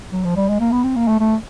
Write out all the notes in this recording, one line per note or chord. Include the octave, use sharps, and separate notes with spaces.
F#3
F3
G3
G#3
A#3
B3
C4
A#3
A3
A3